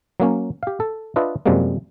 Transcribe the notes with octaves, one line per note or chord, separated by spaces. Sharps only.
F#3 A#3 C#4
G4 F5
A4
D4 F4 B4 D#5 E5
F#2 C3 F3 G3 G#3 A#3